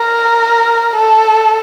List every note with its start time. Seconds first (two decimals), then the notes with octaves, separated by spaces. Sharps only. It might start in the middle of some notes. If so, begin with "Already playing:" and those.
Already playing: A#4
0.96 A4